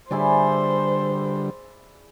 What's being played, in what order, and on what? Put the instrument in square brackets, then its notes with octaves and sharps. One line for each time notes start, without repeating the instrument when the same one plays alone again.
[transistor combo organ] D3 G3 [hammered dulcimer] E4 G#4 D5 [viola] C5